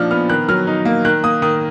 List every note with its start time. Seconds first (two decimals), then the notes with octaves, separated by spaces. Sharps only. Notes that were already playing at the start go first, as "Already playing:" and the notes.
Already playing: A#2 F3 D4 D#4 F6
0.11 B3 F6
0.30 D#3 F#6
0.49 F#3 F6
0.67 D#4
0.85 A#3
1.05 D#3 F#6
1.24 A#3 D#6
1.42 D#3 D#6